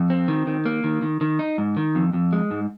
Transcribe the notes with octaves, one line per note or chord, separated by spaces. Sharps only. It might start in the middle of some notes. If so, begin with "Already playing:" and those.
Already playing: F2
C4
D#3
D#3
A#3
D#3
D#3
D#3
D#4
G#2
D#3
F2
F2
G#3
G#2